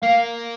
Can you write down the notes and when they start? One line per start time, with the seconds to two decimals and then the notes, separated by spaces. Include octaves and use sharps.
0.03 A#3 F5